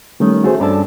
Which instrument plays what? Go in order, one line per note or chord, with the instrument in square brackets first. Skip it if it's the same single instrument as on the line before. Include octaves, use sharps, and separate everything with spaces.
[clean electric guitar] D#3 [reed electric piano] G3 A3 C#4
[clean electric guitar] A3 [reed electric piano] F#4 G#4 C5
[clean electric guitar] G2 D4 A4 [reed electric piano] C#4